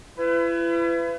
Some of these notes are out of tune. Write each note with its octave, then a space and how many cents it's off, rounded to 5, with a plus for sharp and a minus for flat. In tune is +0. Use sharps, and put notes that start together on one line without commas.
E4 +40 B4 +30